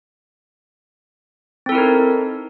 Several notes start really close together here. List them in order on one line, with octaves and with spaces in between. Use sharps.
C4 A4 E4 A#4 D#4